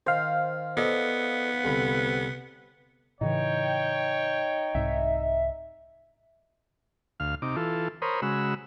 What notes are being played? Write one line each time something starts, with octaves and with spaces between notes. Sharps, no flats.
D#3 C5 F5
B3 A4 D5 D#5
C2 D3 B5
A2 C#3 E3 D#4 C#5 G5
C2 G#2 E5
D2 F5 F6
C3 D#4 D6
E3 F4 A4
A#4 C5 C#5 B5 D#6
C#3 G#3 F#4 B5 E6